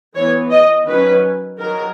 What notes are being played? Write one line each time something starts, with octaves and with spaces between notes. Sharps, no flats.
E3 B3 C#5
D#5
D#3 F#3 C#4 B4
D#3 F#3 A#4